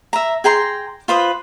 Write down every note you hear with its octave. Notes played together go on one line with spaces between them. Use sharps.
E5 A#5
G#4 G5 A#5 C6
F4 B4 C5 D#6